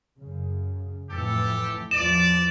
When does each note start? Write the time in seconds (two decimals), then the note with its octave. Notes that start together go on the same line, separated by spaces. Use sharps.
0.20 F#2 C#3
1.10 F2 A2 E3 G4 A4
1.91 E2 E3 F3 D5 E7